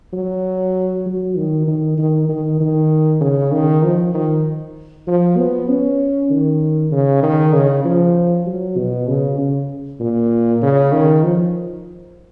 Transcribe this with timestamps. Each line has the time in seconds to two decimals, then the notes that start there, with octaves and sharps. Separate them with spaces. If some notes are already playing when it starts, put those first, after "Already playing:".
0.13 F#3
1.06 F#3
1.37 D#3
1.67 D#3
1.98 D#3
2.29 D#3
2.60 D#3
3.21 C#3
3.52 D#3
3.83 F3
4.14 D#3
5.07 F3
5.38 B3
5.69 C#4
6.30 D#3
6.91 C#3
7.23 D#3
7.53 C#3
7.85 F3
8.46 F#3
8.77 B2
9.08 C#3
9.38 C#3
10.00 A#2
10.62 C#3
10.93 D#3
11.23 F3